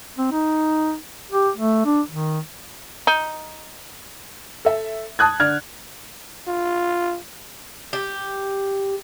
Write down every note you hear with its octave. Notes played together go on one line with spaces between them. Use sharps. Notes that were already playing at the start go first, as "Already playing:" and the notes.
C4
D#4
G4
A3
D4
D#3
D#4
A4 E5
A5 D#6 F#6 G#6
D3 D5 F6 G#6
F4
G4